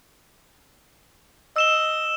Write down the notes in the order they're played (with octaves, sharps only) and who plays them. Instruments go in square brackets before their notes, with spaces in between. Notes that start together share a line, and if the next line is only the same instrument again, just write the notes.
[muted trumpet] D#5 [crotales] E6 E7 G7